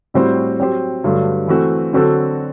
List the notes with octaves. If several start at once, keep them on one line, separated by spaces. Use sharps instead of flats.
A2 G3 C4 F#4 C5
F#3 C4 G4 C5
G2 D3 F#3 A3
E3 A3 C4 F#4
D3 F#3 C4 F#4 A4